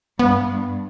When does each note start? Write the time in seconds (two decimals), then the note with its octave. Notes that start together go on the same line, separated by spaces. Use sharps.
0.19 G2 B3